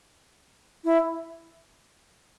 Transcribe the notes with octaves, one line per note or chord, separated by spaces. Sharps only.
E4